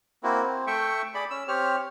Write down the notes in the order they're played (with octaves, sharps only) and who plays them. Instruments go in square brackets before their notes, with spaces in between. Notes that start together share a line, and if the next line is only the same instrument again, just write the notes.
[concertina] A#3 C4 E4 F#4
C4
A3 E5 G5 C#6
G#4 D5 B5
C#4 E6
C4 G4 C#5 F6